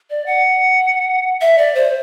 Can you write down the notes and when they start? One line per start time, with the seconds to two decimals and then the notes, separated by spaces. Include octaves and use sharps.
0.10 D5
0.26 F#5
1.41 E5
1.58 D5
1.75 C5